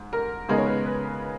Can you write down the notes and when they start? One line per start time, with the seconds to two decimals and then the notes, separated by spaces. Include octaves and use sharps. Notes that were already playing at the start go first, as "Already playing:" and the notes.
Already playing: G#2
0.13 A#4
0.49 C#3 G#3 B3 D#4 A#4
0.58 C#5
0.67 B4
0.86 B4